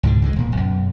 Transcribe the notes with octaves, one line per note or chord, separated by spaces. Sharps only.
C#2 G#2 B2 D3
C#2 D3 G#3
E1 A#2
B1 F#2